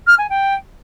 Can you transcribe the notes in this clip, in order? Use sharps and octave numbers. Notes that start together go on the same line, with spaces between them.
F6
G#5
G5